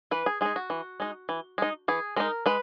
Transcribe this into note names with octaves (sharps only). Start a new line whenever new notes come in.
E3 B4
G#4
G#3 D#4 G#4
F#4
E3
G#3 D#4
E3
G#3 D#4
E3 G#4
G#3 D#4 A#4
G#3 B4